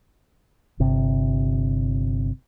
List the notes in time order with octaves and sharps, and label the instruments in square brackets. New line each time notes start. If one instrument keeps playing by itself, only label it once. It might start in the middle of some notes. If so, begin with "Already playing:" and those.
[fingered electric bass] G1 C3